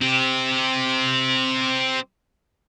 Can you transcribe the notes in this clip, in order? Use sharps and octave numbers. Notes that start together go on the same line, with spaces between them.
C4 G4